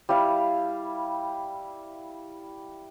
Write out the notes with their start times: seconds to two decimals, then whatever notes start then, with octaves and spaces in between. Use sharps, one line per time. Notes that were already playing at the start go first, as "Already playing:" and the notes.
0.09 G3 E4 F5